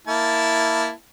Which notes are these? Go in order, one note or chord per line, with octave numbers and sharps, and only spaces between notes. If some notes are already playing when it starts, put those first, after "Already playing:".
A#3 E4 A5